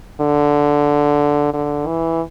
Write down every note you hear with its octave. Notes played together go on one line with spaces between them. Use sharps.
D3
D3
E3